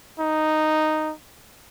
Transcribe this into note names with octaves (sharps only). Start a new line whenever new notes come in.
D#4